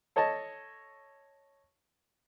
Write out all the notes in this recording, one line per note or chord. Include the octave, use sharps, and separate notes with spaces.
A4 C#5 D#5 A5